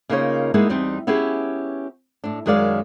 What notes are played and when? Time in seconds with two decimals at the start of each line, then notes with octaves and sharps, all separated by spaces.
0.09 C#3 A#3 D#4 F4 A#4 C#5
0.54 G#3 A#3 B3 D#4 E4 G#4
0.69 E2 G3 C4 D#4
1.07 B3 C#4 E4 G4 G#4
2.24 A2 D4
2.46 F#2 D#3 G#3 C#4 D5 F5